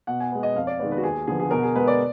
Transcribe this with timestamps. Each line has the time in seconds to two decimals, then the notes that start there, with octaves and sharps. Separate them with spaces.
0.07 B2 F#5
0.20 G#5
0.31 G#3 B3
0.43 D#5
0.55 F2 F5
0.67 D5
0.79 D#3 G#3 B3 D5
0.91 B4
0.97 F#4
1.04 D#2 G#4
1.27 D3 F3 B3 G#4
1.40 G#4
1.51 B2 A#4
1.63 G#4
1.75 G#3 B3 B4
1.88 D5